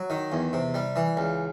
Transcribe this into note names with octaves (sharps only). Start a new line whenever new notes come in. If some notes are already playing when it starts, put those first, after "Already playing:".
Already playing: F#3
D#3
E2
C3
G3
E3
C#2